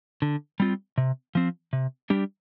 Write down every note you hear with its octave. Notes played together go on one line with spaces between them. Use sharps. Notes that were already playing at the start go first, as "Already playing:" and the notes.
D3
G3 C4 F4
C3
F3 C4
C3
G3 D4 G4